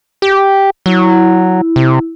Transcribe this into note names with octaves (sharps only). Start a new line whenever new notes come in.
G4
F#3 E4
C3